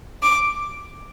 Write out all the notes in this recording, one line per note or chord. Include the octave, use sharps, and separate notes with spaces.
D6